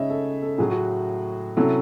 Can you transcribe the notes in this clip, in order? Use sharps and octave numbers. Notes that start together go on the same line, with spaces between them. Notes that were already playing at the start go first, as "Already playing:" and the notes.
Already playing: C#3 G#3 D#4 C#5 D#5 E5
A4
A4
A2 F#3 A3 G#4
F#4
C3 F#3 C#4 E4 A4